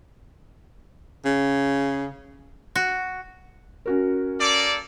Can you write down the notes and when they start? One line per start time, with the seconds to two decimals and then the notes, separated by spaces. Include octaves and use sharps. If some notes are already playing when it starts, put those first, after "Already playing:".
1.25 C#3
2.76 F#4
3.86 C#4 F#4 A#4
4.40 A#3 A4 D5